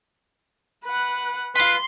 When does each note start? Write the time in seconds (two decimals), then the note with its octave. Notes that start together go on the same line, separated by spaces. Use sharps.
0.86 B4 F#5
1.55 F4 B4 B5 C6